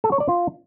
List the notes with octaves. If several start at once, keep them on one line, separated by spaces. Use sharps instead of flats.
A4
C#5
D5
F4